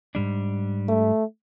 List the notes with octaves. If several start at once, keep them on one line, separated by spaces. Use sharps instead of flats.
G#2 G3 D4
A3